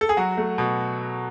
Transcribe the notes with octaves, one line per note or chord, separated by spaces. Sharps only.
A4
G#4
F#3 F#4
A3
B2